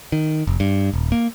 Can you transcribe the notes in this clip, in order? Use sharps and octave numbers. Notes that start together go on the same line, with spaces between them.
D#3
F1
G2
D#1
A#3